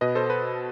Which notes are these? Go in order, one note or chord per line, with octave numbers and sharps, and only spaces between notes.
B2 B4 D#5
A4 C5
B4